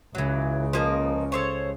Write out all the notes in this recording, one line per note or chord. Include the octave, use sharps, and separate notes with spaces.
C#2 C#3 E3 F#3
F3 A#3 D#4
A4 C5 C#5